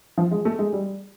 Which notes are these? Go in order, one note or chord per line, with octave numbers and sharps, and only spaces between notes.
F3
G#3
A3
G#3
G3